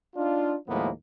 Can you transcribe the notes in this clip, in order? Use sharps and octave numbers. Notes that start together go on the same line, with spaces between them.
D4 D#4 F4
D#2 A2 F3 G#3 A#3 B3